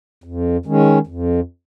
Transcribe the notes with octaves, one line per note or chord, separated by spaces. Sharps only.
F2
D#3 G#3 C#4
F2